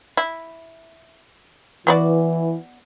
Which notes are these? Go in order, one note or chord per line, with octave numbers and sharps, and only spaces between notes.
E4
E3 B3 F#4 D5